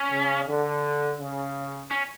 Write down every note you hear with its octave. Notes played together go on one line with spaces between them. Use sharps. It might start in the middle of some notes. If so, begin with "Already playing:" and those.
Already playing: C#4
C#3
D3
C#3
C#4